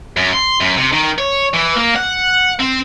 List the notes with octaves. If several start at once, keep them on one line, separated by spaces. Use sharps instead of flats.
F#2
C6
F#2
C3
D#3
C#5
E3
A#3
F#5
C4